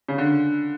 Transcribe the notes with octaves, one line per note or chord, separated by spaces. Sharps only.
C#3
D3